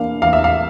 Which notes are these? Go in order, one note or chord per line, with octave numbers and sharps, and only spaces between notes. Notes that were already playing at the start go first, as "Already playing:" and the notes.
Already playing: E3 A#3 D4 F5
E3 F5
E5
F5